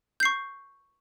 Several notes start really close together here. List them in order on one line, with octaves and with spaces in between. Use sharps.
G6 C7 C#6